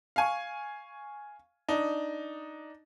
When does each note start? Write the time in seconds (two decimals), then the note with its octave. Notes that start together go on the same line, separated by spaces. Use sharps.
0.16 F5 G#5 C#6
1.68 D4 D#4